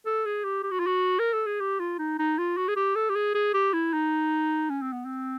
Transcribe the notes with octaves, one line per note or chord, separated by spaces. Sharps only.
A4
G#4
G4
G4
F#4
F4
F#4
A#4
A4
G#4
G4
F4
D#4
D#4
F4
F#4
G#4
G4
A4
G4
G#4
G#4
G4
E4
D#4
C#4
C4
B3
C4